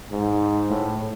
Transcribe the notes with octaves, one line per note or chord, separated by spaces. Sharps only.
G#2
A2